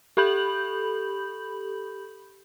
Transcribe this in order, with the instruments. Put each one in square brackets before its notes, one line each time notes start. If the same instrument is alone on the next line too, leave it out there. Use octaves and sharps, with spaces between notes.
[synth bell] G4 A4 B5 G6 F#7